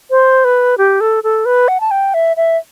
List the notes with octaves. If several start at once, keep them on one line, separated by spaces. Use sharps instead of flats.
C5
B4
G4
A4
A4
B4
F#5
A5
G5
E5
E5